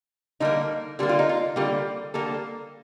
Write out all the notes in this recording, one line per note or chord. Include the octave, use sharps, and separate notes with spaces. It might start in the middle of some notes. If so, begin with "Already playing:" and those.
D3 G3 A#3 D#4
D3 G3 A#3 G4
F4
D#4
F4
D3 G3 A#3 G4
D3 G3 A#3 A4